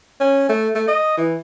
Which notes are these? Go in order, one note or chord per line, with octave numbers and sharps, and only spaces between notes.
C#4
A3
A3
D#5
E3